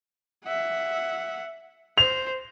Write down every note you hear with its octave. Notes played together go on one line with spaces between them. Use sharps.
E5 F#5
C5 F7